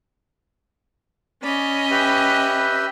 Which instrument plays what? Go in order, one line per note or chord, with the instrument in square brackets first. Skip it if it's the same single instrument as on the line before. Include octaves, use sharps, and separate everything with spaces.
[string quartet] C#4 D#5 B5 [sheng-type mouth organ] D5
[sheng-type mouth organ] G4 B4 E5